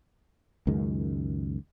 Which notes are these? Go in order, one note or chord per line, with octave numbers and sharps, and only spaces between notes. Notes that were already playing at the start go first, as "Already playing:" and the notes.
C#2 F#2 D#3 G#3